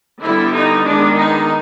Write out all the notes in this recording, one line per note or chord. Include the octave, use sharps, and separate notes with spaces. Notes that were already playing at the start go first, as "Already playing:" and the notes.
D3 G3 B3 E4
D#4
D#3 G#3 B3 D4
D#4